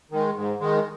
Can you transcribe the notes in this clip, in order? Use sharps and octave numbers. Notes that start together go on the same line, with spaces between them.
D#3 G#3
G#2
D#3 G#3